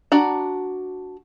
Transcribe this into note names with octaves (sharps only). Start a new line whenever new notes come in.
D4 F#4 A#5